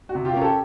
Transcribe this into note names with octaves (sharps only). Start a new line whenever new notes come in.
F#4
C3
F4 G4
C#4 A#4
G4 A4